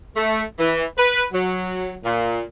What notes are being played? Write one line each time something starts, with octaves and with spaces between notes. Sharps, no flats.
A3
E3
B4
F#3
A#2